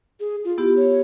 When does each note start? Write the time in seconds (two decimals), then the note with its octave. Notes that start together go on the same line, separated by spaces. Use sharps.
0.20 G#4
0.45 F4
0.58 B3 E4 G4
0.76 C#5